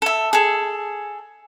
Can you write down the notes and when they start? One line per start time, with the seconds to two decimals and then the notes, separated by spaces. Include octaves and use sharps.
0.02 A4 E5
0.33 G#4 A4